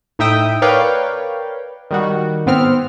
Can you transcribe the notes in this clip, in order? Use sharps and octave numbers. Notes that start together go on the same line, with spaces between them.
A2 D#4 E5 G5 D#6
A#4 B4 C#5 D5 F5 G5
D#3 G3 F#4
G#2 B3 C4 F6